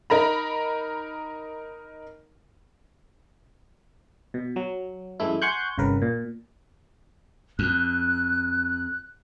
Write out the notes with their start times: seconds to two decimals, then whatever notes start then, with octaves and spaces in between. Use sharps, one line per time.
0.10 D#4 A#4 A#5 B5
4.34 B2
4.56 F#3
5.20 F#2 E3 G#3 A3 E4
5.42 F#5 G#5 C6 C#6 F#6 G6
5.78 G1 C2 C#3 A#4 B4
6.02 A#2
7.59 F2 F#6